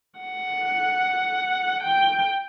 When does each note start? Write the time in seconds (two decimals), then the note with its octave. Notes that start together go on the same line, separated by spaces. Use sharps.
0.19 F#5
1.83 G5